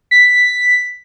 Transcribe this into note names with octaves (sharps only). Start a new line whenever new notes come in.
B6